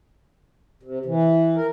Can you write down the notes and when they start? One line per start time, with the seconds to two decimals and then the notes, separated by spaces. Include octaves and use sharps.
0.83 C3
1.06 E3
1.56 A#4